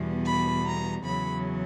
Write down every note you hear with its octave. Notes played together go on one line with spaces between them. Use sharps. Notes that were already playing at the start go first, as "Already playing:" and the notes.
Already playing: E2 B2 G3
B5
A#5
E2 C#3 F#3 B5